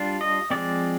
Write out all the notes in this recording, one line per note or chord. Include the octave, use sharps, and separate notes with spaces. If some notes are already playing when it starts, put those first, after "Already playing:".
Already playing: G3 D4 F4
D#5
F3 G#3 C4 D5